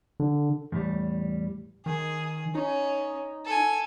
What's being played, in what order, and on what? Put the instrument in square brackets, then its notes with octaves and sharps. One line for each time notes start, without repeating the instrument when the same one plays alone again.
[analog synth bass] D3
[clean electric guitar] E2 A2 G3
[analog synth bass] D#3 [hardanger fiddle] G#4
[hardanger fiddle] C#4 [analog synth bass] D#4
[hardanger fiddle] A4 G#5